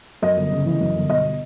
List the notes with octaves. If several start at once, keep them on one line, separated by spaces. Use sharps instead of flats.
F#2 D#5
G1
C#3
E3
F#2
G1
B2 D#5